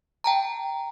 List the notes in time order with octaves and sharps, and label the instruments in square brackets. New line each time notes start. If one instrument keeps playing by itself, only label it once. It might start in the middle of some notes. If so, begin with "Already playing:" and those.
[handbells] G5 A5 A#5